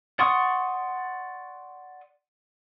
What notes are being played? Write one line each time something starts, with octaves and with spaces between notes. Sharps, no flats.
D5 F#5 C6 C#6 D#6